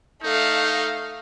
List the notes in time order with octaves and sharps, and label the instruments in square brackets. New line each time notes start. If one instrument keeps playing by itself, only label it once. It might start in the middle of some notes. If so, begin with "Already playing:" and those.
[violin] A3 F5 [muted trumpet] D#4